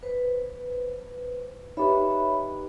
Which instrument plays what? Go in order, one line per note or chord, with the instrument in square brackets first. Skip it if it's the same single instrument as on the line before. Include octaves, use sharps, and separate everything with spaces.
[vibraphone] B4 C5
[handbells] D#4 G4 B4 [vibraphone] C#5 E5 B5